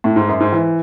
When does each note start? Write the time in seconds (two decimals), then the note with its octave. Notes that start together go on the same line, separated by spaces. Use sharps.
0.04 A2
0.16 G#2
0.29 F#2
0.40 G#2
0.53 E3